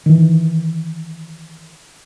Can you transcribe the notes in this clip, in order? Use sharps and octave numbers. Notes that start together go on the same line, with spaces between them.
D#3 E3